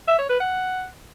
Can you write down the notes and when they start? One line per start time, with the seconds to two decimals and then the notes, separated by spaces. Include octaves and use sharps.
0.08 E5
0.19 C#5
0.29 B4
0.40 F#5